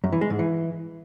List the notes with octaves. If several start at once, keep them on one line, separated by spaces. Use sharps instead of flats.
F#2
E3
G#3
G#2
E3